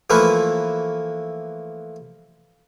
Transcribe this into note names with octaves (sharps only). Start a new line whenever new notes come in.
E3 F3 A3 A#3 B4